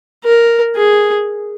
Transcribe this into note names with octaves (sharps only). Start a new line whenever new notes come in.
A#4
G#4